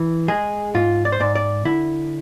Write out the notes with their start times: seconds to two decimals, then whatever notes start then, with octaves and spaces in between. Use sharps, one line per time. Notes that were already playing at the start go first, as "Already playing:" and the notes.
Already playing: E3
0.28 G#3 G#4
0.74 G#2 F4
1.05 D5
1.12 C5
1.20 G#2 D5
1.35 D5
1.65 D3 E4